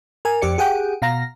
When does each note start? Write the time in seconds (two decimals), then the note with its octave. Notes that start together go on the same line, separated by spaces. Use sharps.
0.25 A#4 G#5
0.42 F2 G4 D5 C#7
0.58 G4 G#4 F#5 G5
1.02 B2 F5 A#5 A#6